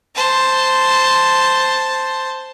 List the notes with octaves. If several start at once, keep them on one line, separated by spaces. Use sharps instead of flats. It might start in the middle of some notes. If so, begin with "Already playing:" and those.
C5 A5